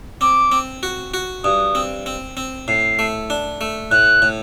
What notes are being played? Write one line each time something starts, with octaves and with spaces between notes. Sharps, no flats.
C4 D6
C4
F#4
F#4
G2 D#6
C4
C4
C4
A2 C7
A3
D4
A3
A2 F#6
A2